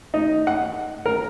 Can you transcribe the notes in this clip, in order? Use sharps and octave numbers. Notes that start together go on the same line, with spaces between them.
D#4
F#5
A#4